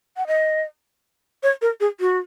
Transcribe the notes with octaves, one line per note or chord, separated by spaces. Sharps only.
F#5
D#5
C#5
A#4
G#4
F#4